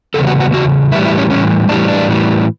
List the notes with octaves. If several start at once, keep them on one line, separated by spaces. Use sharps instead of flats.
E2 C#3 G3 B3 A4
F#4
F#4
E2 C#3 F#4
A2 E3 G3 E4
E4
C#4
A2 E3 G3 C#4
A2 E3 G3 D4
D4
A2 E3 G3